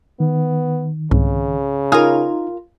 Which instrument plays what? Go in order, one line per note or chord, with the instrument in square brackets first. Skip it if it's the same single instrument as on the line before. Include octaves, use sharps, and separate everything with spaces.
[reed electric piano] D#3 [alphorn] B3
[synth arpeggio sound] C2 G#2 [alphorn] C#3
[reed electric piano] D#4 [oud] F4 A#4 [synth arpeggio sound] G#5 D#6 F6